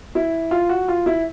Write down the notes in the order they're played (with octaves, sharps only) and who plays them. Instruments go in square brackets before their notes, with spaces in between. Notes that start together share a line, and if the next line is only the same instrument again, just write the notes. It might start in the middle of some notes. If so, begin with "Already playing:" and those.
[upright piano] E4
F4
F#4
F4
E4